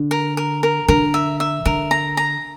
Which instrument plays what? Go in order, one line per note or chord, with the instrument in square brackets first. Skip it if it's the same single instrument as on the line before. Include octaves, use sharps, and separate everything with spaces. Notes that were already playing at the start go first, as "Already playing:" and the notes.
Already playing: [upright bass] D3
[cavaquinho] A#4
A#4
A#4
[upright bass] D3 [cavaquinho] A#4
[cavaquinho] E5
E5
[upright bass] D3 [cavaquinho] A#4
[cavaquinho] A#5
A#5